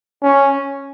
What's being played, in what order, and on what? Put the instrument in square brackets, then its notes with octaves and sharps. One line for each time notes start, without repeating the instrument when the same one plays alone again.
[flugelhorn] C#4